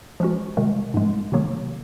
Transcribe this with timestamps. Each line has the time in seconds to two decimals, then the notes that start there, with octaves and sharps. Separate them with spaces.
0.20 F3 G#3 C#4 F#4
0.57 C3 D#3 G#3
0.94 G#2 F3 G#3
1.32 C3 D#3 F#3 A#3